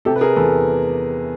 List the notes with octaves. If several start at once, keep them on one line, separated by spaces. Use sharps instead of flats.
C3 G4 A4
B4
G#4 A#4
E2 A4 B4